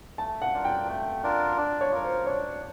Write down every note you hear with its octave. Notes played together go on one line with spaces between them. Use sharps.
A3 A5
F#5
D4 F4 A#4
G5
A3
D4 F4 A#4
D4
C#5
F4 A#4
C5
D4 C#5